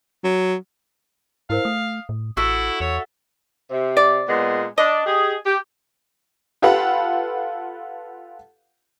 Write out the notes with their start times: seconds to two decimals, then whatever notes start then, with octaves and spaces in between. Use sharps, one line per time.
0.24 F#3
1.50 G#2 E4 A#4 C5 F5
1.65 A3 D#6
2.09 A2
2.37 A1 E4 F#4 A4 E5
2.80 E2 C#5
3.70 C3
3.97 D5
4.28 A#2 G#3 B3
4.78 D4 D#5
5.06 G4 G#4
5.45 G4
6.62 F4 G4 A4 B4 F5 F#5